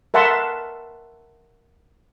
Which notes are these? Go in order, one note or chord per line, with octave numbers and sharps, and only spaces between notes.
A#4 E5 F#5 A5 C6